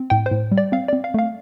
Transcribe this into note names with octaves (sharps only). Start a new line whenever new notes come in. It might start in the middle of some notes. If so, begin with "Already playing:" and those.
Already playing: C4
A2 G5
C5
A2
G3
D5
C4 F5
C4 D5
F5
A3 F5